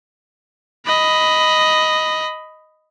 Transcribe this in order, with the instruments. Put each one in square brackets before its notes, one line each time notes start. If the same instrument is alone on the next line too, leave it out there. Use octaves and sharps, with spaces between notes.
[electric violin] D#5 B5